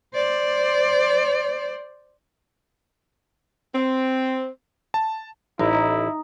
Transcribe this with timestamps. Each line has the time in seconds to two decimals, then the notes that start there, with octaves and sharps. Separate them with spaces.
0.14 C5 D5
3.75 C4
4.94 A5
5.59 A1 D#4 E4